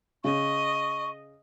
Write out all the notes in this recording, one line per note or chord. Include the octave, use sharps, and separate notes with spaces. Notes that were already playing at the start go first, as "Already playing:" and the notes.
C#3 D#5 C#6